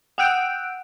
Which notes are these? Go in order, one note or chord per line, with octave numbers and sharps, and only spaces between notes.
F#5 G5 E6 F#6 G6 D7